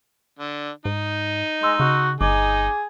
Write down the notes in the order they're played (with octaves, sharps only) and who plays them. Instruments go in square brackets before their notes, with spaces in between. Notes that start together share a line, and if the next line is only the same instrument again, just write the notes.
[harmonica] D3
[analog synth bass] G#2 [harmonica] D#4
[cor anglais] G#3 [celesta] C6 E6
[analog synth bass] C#3 [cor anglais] F#4
[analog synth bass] G1 [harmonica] D#4 [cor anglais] G#4 [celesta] D6